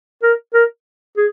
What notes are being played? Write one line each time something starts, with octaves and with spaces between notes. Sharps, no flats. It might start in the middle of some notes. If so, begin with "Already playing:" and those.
A#4
A#4
G#4